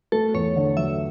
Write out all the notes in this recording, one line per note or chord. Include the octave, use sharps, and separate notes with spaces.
A3 A4
E2 C#5
D3
F#3 E5